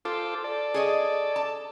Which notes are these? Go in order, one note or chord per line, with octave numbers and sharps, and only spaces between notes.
F4 A4 C5 D6
A4 D5
G#4 C#5 D#5
A5